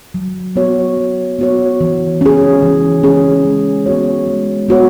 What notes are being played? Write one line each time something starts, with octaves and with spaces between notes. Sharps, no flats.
F#3
B3 F#4 C#5
F#3
B3 F#4 C#5
E3
C#4 G#4
E3
C#4 G#4
G#3
B3 F#4 C#5
G#3
B3 F#4 C#5